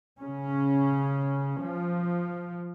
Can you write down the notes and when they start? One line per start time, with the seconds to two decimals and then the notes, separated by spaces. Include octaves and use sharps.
0.19 C#3 C#4
1.61 F3